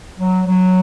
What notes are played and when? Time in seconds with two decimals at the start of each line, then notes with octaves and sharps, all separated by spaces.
0.19 F#3
0.47 F#3